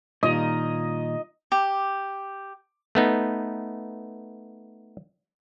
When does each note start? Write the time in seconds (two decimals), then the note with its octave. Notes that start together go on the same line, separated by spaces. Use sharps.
0.23 A#2 D#3 G3 D#4 F4 D#5
1.52 G4
2.95 A3 B3 D#4